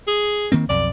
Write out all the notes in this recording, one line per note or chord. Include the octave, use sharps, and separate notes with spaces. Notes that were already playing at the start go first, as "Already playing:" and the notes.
G#4
D#3 A#3 C4
B1 F2 D5